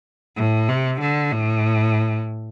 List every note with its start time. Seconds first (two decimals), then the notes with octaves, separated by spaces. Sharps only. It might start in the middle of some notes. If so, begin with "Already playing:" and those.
0.37 A2
0.68 C3
1.01 D3
1.32 A2